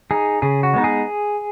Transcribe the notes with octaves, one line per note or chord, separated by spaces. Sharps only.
D#4 G#4
C#3 G#4
F#4
G#3 B3 D#4
G#4